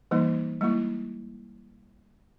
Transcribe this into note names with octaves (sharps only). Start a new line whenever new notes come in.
E3 G3 A#3 D#4
G3 G#3 A#3 E4